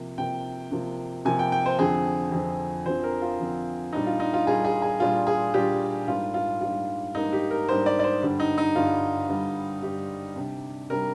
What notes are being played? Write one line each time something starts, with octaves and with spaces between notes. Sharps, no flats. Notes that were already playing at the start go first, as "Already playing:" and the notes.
Already playing: C3 F3 A#3
C3 F3 A#3 G5
C3 F3 A#3
C3 F3 A#3 G#5
G5
G5
C5
F2 D3 F3 C4 G#4
F2 D3 F3 C4
F2 D3 F3 C4 C5
A#4
F4
F2 D3 F3 C4
A#2 G3 D4 D#4
F4
D#4
F4
A#2 G3 D4 G#4
G#4
G#4
A#2 G3 D4 F4
G#4
A#2 G3 D4 G4
G#2 G3 A#3 D4 F4
F4
G#2 G3 A#3 D4 F4
G#2 G3 A#3 D4 D#4
G4
A#4
G#2 G3 A#3 D4 C5
D5
D5
C5
G2 D3 G3
D#4
D#4
G2 D3 G3 F4
G2 D3 G3
G2 D3 G3 G4
C3 G3 D4
C3 G3 D4 A#4